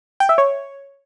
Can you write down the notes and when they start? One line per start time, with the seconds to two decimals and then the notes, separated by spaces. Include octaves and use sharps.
0.20 G5
0.29 E5
0.38 C#5